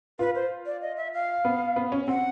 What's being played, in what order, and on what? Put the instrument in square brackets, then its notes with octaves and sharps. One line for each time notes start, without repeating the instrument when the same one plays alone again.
[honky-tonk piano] F4 [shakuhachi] B4
[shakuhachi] C5
D5
D#5
E5
F5
[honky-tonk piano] B3
B3
C#4
[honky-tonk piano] C4 [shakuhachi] F#5